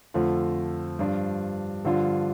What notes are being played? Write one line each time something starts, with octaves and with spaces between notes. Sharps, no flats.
F2 D3 F3 A3 F4
G2 F3 D4 F4
G2 D3 F3 D4 F4